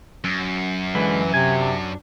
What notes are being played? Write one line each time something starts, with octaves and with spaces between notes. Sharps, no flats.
F#2
D3 E3 G#3 B4
C3 G#5
D4